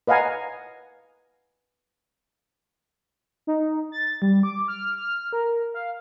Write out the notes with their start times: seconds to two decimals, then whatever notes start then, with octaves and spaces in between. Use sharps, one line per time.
0.07 B4 D#5 F5 F#5 G#5 A#5
3.47 D#4
3.92 A6
4.22 G3
4.43 D6
4.68 F6
4.96 F6
5.33 A#4
5.74 F5